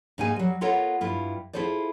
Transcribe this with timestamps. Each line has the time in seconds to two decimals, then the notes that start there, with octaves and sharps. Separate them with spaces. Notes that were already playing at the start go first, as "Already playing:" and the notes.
0.18 G#2 A#3 D#4 G#4 G#5
0.36 F#3 G3
0.61 B3 F4 A4 A#4 C#5 F#5
1.01 G2 E4 F4
1.53 E4 F4 G#4 A4 C5 D5